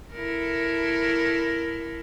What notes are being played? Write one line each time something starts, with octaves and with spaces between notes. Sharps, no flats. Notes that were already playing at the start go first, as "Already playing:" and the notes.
E4 A4 A#4